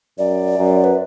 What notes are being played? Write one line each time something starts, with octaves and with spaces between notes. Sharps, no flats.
F#2 D5
F#2
B4